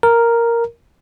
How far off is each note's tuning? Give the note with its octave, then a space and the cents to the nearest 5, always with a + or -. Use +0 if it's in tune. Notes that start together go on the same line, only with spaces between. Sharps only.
A#4 +0